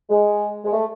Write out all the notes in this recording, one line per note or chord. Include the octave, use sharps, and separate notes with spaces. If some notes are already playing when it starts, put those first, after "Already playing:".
G#3
G#3
A3